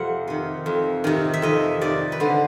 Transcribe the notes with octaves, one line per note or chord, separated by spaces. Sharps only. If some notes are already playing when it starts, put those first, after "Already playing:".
Already playing: F2 C3 C5 F#5
C3 D#3
F2
C3 D#3
E5
F2 D#5
C3 D#3 D5
B4
D3 C5